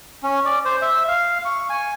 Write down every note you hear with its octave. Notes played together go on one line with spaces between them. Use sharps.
C#4
D5
C5
E5
F5
C#6
G#5